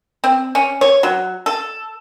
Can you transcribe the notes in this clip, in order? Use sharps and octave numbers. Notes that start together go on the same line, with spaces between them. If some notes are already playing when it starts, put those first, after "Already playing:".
C4
C#4
C#5
F#3
A4